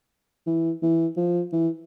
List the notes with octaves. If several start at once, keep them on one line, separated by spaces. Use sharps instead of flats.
E3
E3
F3
E3